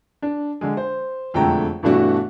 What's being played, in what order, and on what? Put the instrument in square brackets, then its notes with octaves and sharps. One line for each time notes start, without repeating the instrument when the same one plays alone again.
[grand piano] D4
D3 G#3
C5
E1 F2 D3 A3 G5 A#5
G2 B2 E3 A3 D4 F#4